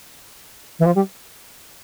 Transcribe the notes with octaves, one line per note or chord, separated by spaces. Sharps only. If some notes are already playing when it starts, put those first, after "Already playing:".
E3
F3
G3